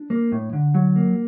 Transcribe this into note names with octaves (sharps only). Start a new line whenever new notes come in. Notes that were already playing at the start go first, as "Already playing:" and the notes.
Already playing: D4
A#3
A2
D3
F#3
A#3